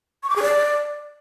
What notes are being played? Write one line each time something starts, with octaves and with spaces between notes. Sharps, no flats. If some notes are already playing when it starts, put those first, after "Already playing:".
C#6
D6
G#4
D5